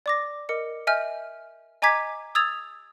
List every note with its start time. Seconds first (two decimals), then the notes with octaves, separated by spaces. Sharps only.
0.06 D5 D6 A#6
0.49 A#4 D#5 D6 C#7
0.87 D#5 E5 G#5 F6 G6
1.82 D#5 G#5 A#5 D6 G#6 B6
2.35 D#6 E6 G#6 A6 F7